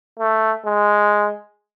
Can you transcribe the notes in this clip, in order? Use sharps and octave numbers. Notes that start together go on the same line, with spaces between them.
A3
G#3